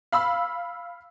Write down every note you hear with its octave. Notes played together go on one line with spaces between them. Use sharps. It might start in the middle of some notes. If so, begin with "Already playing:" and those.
F5 B5 E6